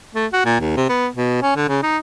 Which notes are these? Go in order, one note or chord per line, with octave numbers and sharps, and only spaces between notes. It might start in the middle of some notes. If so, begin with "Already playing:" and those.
A3
F#4
A#2
D#2
C3
B3
B2
C#4
D3
C#3
D#4